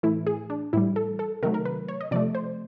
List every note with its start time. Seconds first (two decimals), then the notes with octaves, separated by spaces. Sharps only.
0.03 A2 E3 A3 E4
0.27 G#4
0.50 D4
0.73 A2 E3 G3 E4
0.96 A4
1.19 A4
1.43 C3 D#3 F#3 A3 A#4
1.54 A#4
1.65 B4
1.88 C#5
2.01 D#5
2.11 C3 F3 A3 D5
2.35 C5